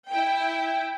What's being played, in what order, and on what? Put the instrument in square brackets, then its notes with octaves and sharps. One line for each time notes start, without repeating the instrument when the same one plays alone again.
[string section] E4 G5